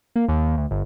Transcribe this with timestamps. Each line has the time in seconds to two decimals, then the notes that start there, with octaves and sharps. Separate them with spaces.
0.16 A#3
0.28 D#2
0.58 D2
0.71 G1